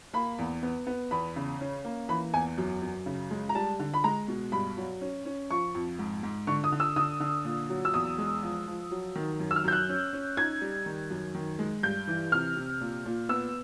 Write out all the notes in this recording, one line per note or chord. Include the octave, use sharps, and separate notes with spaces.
A#3 B5
E2
B3
B3
E2 B5
C#3
C#4
A#3
E3 B5
E2 G#5
F#2
F#2
C#3
G#3
A#5
G3 A5
D3
B5
G#3 A#5
B2
G2 B5
F#3
C#4
C#4
F3 C#6
F2
G#2
G#2
D3 C#6
D#6
D3
E6
D3 D#6
D3
A#2
F#3
E6
E2 D#6
G#3
F3
F3
F#3
D#3
F#2
E6
F6
F#2 G6
F#6
C#4
C#4
D#4 G#6
G3
D#3
F#2
D#3
G#3
G2 G6
E3
C3 F6
C3
A#2
A#2
B3 E6